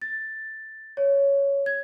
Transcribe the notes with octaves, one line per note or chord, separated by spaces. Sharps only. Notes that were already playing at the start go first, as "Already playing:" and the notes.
A6
C#5
G#6